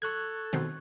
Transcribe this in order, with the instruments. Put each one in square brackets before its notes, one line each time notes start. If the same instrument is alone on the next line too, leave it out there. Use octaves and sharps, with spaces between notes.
[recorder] A4 [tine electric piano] C#6 F#6 G#6
[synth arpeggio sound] B2 D#3 C4